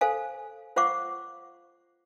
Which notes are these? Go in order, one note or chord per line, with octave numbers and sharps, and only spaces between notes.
A4 C5 F5 G#5
F4 C5 F5 F#5 C#6 D6